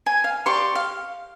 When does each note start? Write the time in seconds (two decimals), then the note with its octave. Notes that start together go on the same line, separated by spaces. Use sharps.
0.06 G#5
0.24 F5
0.46 G4 D5 C6 C#6
0.75 F5